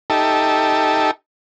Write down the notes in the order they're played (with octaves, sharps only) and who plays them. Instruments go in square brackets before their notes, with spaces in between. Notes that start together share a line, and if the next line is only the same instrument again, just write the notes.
[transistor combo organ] D#4 G4 A4 E5 A5